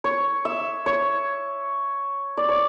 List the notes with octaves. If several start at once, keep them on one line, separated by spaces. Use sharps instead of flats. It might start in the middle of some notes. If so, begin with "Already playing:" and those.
C#5
E5
C#5
D5
C#5